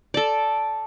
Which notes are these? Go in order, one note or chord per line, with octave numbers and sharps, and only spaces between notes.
A4 D5